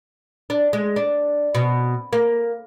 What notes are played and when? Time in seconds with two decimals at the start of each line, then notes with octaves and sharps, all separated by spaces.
0.50 D4
0.73 G#3
0.96 D4
1.55 B2
2.13 A#3